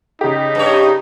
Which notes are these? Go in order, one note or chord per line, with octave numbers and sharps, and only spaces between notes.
C#3 D#4 G4
G2 A4 C#5